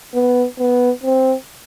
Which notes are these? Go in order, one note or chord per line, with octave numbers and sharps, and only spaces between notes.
B3
B3
C4